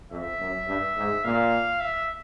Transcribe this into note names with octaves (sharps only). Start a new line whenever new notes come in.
F2 E5
F#2
G2
G#2
A#2 F5
E5